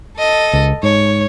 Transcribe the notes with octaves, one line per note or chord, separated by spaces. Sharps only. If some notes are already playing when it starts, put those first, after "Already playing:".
A4 D#5
C#2
G#2 C#5